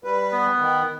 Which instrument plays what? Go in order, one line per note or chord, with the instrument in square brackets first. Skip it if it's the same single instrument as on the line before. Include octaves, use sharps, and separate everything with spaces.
[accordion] G3 B4
[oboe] B3
[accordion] D#3